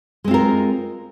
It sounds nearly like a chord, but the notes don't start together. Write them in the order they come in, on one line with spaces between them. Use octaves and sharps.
G#3 C4 F4 A#4